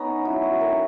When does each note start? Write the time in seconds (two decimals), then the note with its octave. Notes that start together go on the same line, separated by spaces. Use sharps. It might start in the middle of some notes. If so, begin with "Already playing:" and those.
Already playing: B3 C#4 D#4
0.25 F#3 E4
0.43 F#4
0.60 D#3 A#4